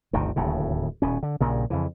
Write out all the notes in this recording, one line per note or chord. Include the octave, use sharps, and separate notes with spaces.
G1 D2 C3 D#3
D1 D#2 A2 C#3
D#1 B2 C#4
D3
A#1 G2 A#2 C#3
F2 C#3 E3